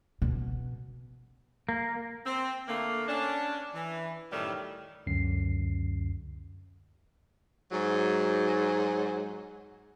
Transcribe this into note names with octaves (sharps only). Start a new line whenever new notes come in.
B2
A#3
C4
D3 A3 A#3
C#4 D4
E3
F#2 A2 D#3 G3 G4
C#2 F#2 D3 C7
G#2 F#3